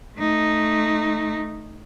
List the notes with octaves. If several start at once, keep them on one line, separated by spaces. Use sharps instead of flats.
A3 D#4